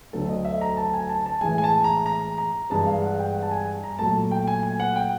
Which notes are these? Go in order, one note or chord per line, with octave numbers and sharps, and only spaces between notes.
D2 D3 F#3 A3 A4
D#5
E5
A#5
A5
G#5
A5
A5
A2 E3 G#3 G#5
G#5
A5
A#5
A#5
A#5
G2 E3 G#3 A5
F5
F#5
G5
F#5
A5
G#5
A#5
A#2 F#3 A3 A5
G5
G#5
G#5
F#5
G5